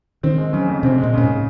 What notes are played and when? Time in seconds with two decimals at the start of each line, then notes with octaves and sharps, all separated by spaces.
0.23 D#3 C4
0.38 G#3
0.53 C#3 F#3
0.68 F2
0.83 C3 C4
0.98 G#3
1.03 A#2
1.14 A#2 C#3
1.23 G#2